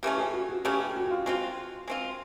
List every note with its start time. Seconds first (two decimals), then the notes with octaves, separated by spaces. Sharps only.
0.03 C#3 E3 A3 C#4 G4
0.18 G#4
0.33 F#4
0.49 F#4
0.64 C#3 E3 A3 C#4 G4
0.80 G4
0.95 F#4
1.07 F#4
1.10 F4
1.26 G#3 C4 F4 F#4
1.88 G#3 C4 F4